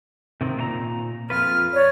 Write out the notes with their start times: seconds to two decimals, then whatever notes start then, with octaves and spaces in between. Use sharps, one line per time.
0.41 C3 D#3 C4
0.57 A#2 C5 A#5
1.30 F2 F4 B4 F6
1.74 C#5 D5